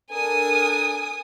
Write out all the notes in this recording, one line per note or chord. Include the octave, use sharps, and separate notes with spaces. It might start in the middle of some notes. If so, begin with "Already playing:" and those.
D4 A4 A#4 G#5 D#6